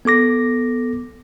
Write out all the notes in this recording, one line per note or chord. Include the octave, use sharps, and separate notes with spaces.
B3 A4 D6 A#6